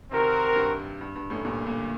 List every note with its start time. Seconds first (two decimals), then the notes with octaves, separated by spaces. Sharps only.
0.11 C3 D#3 C4 F#4 A#4
0.56 G2
1.01 G2
1.16 G2
1.30 F#2 A2
1.45 G2 A#2
1.67 A#2 D3